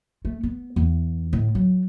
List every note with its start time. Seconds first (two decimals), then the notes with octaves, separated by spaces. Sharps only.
0.25 A3
0.43 B3
0.76 E2
1.33 A2
1.55 F#3